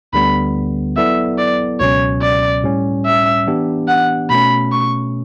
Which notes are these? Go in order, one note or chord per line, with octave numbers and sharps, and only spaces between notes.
D2 D3 G3 B3 B5
F#3 B3 E4 A4 D5 E5
D5
C#2 B2 F#3 C#4 C#5
D5
A2 G3 C#4
E5
E3 B3 D4 G4
F#5
B2 A3 C#4 B5
C#6